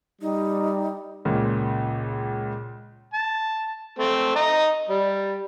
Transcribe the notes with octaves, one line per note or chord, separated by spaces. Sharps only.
G3 D#4
C#2 A#2 C#3
A5
A3 C4
D#5 A#5
G3